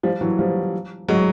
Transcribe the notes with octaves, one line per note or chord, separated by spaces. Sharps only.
F3 G3
E3 F#3
F3 G3
F#3 G#3